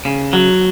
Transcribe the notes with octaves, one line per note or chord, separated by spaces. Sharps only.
C#3
F#3